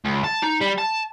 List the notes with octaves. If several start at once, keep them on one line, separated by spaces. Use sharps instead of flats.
C#2
A5
D#4
G3
A5